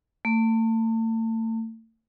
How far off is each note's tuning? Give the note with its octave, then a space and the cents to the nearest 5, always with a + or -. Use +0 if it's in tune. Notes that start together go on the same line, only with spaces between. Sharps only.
A3 +40